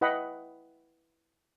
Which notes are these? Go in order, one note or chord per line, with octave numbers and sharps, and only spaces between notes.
E4 B4 D#5 F#5 G5 B5